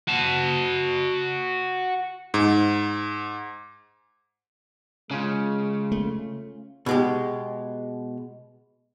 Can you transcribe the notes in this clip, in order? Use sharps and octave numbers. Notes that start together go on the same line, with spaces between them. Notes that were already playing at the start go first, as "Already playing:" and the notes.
F#4 A5
G#2
C#3 G#3 C#4 F4
A3
B2 G#3 G4